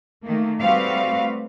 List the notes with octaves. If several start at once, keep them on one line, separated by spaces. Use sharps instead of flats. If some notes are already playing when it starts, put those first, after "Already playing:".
D#3 A3 A#3
G3 A3 C4 F#4 B4 F5